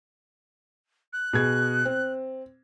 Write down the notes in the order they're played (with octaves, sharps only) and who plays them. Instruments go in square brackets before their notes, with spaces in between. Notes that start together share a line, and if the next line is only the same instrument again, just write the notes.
[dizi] F#6
[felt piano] B2 G#4 G#6
C4